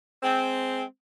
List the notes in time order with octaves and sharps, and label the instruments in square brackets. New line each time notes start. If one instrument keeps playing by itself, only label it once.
[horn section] G#3 C4